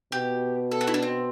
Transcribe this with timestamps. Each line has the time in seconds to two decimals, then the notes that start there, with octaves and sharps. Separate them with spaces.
0.12 B2 G4
0.71 A4
0.81 F#4
0.87 E4
0.94 D4
1.02 C4